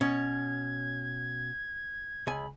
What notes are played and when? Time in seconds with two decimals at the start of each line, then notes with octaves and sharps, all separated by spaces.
0.01 B2 C#4 G#6
2.27 C#2 G#5 B5